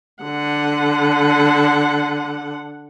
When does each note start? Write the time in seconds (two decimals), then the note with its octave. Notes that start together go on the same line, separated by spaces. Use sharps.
0.23 D3 F#5